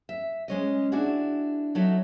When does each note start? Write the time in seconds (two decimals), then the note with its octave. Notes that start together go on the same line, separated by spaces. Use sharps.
0.09 E5
0.48 G#3 C#4 D#5
0.92 D4 E4 F#4 G#4
1.75 F#3 D#4 A4 E5